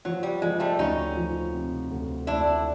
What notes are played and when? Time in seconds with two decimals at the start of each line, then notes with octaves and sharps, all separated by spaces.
0.05 F3 F#3
0.23 G3
0.42 F3 G#3
0.60 G3 A3
0.79 D2 C#4 D#4
1.17 F3
1.53 C3
1.91 D2
2.27 D2 D4 E4